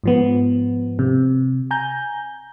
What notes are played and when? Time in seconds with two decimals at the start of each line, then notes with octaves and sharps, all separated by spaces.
0.04 G#2 F3 B3
0.99 C3
1.71 G#5 A#5 G6